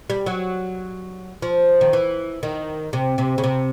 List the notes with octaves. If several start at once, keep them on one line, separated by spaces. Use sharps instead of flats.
G3
F#3
F3
D#3
E3
D#3
C3
C3
C#3
C3